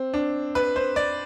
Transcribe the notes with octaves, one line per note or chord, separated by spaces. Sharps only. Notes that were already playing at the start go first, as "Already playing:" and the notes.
Already playing: C4
D4
B4
C5
D5